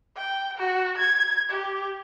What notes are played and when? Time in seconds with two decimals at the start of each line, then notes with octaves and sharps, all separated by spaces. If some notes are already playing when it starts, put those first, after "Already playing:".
0.16 G5
0.57 F#4
0.97 G#6
1.50 G4